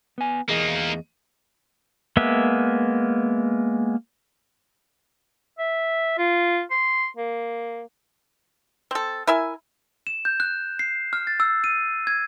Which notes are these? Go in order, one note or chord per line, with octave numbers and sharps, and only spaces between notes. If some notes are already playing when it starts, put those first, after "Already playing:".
B3 G#5
E2 A#3 D#4 G#4 D#5
G#3 A#3 B3 E5
E5
F4
C6
A#3
C4 A4
E4 A#4 E5 G#5
E7
G6
F#6
C7
F6
A6
E6
D#7
G#6